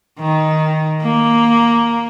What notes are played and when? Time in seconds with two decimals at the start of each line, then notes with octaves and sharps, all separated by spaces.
0.20 D#3
1.01 A#3